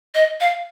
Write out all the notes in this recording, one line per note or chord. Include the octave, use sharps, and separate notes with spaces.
D#5
F5